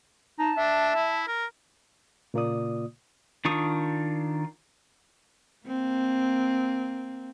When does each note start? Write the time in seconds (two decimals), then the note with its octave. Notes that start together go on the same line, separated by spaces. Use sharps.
0.39 D#4 A5
0.57 D4 E5
0.95 E4
1.27 A#4
2.34 A#2 C#3 A#3 F4 D5 D#6
3.45 D#3 D4 F4 C#6 D#6
5.66 A#3 C4